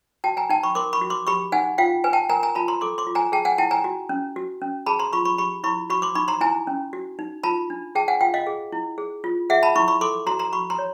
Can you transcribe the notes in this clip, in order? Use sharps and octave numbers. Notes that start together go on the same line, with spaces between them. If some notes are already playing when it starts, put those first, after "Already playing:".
F#4 G5 A5
G#5 A#5
D#4 G5 A5
B5 C#6
A#4 C6 D6
B5 C#6
F#4
C6 D6
G4 B5 C#6
D#4 F#5 G#5
F4 F5 G5
B4 G#5
G5 A5
A#4 G#5 A#5
G#5 A#5
F4 A5 B5
A#5 C6
A4 C6 D6
C6 D6
F4
G#5 A#5
G#4 G5 A5
F#5 G#5
E4 G5 A5
G#5 A#5
F#4
C#4
F#4
C#4
G#4 A5 B5
A#5 C6
F4 B5 C#6
B5 C#6
G4 B5 C#6
E4 B5 C#6
F#4 B5 C#6
C6 D6
D#4 B5 C#6
A#5 C6
E4 G#5 A#5
C#4
F#4
D#4
F4 A5 B5
D4
G#4 G5 A5
F#5 G#5
F4 F5 G5
D#5 F5
G#4
E4
G#4
F4
G#4 E5 F#5
A5 B5
E4 B5 C#6
B5 C#6
A4 C6 D6
F#4 A#5 C6
A#5 C6
F#4 B5 C#6
A#5 C6
C#5